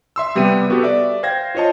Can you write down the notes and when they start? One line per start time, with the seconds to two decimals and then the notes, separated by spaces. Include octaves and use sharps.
0.16 E5 C6 E6
0.35 C3 G3 B3 G4 D#7
0.70 B3 F#4 G4 A4 B4
0.83 D5 E5
1.23 C5 F5 G5 G#6 A#6
1.55 F4 C5 C#5 D#5 A5